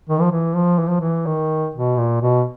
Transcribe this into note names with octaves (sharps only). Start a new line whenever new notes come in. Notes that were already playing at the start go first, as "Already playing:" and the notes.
D#3
F3
E3
F3
E3
F3
E3
D#3
B2
A#2
B2